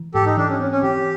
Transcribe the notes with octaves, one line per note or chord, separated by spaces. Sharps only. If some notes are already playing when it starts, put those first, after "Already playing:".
Already playing: E3
G#2 G4 A4
D#4
E3 D4
C#4
C4 C#4
C#4
E3 G4